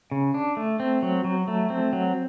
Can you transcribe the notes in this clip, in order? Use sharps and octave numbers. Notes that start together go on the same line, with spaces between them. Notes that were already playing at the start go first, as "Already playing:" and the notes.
C#3
D4
A3
C4
F#3
F#3
A3
C4
F#3